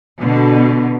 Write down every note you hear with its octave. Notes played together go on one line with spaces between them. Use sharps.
B2 D3